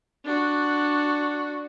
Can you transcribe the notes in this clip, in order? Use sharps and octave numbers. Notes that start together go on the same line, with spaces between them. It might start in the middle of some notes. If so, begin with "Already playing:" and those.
D4 F#4